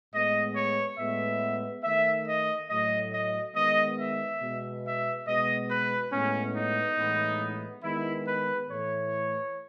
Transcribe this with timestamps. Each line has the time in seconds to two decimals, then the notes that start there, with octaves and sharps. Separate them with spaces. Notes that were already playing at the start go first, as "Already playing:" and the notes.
0.13 A2 G#3 B3 D#5
0.56 C#5
0.98 A2 G#3 B3 E5
1.83 D#3 A3 E5
2.27 D#5
2.69 A2 F#3 A3 D#5
3.12 D#5
3.55 D#3 G#3 B3 D#5
3.99 E5
4.41 B2 G#3 B3
4.84 E5
5.26 B2 G#3 B3 D#5
5.69 B4
6.12 A2 G#3 B3 C#4
6.55 D#4
6.97 A2 E3 G#3 B3
7.83 D#3 G#3 B3 E4
8.27 B4
8.69 A2 E3 A3 C#5